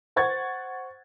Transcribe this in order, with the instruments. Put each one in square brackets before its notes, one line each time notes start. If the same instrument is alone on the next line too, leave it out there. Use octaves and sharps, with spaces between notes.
[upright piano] C5 F#5 C#6 G#6 A6